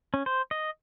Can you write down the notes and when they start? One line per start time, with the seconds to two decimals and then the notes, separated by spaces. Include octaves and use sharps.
0.14 C#4
0.26 C5
0.51 D#5